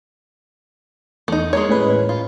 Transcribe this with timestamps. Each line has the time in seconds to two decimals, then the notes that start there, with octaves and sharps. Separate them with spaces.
1.28 E2 A3 D#4
1.53 G#3 A#3 C#5
1.69 A2 C#4 B4
2.09 F4